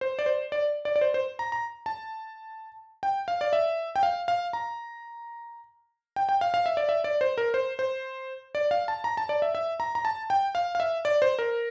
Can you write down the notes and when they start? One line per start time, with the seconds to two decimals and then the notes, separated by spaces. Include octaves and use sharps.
0.01 C5
0.19 D5
0.26 C5
0.52 D5
0.85 D5
0.96 D5
1.01 C5
1.14 C5
1.39 A#5
1.52 A#5
1.86 A5
3.03 G5
3.28 F5
3.41 D5
3.53 E5
3.96 G5
4.03 F5
4.28 F5
4.53 A#5
6.16 G5
6.29 G5
6.41 F5
6.54 F5
6.66 E5
6.77 D5
6.89 E5
7.04 D5
7.21 C5
7.38 A#4
7.54 C5
7.79 C5
8.55 D5
8.71 F5
8.88 A5
9.04 A#5
9.17 A5
9.29 D5
9.42 E5
9.55 E5
9.80 A#5
9.95 A#5
10.05 A5
10.30 G5
10.55 F5
10.75 F5
10.80 E5
11.05 D5
11.22 C5
11.39 A#4